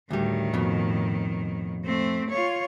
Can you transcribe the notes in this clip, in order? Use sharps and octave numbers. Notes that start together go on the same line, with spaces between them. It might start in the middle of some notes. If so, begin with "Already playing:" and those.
D2 A2 D#3 G3
F2 B2
A3 C4
F4 C#5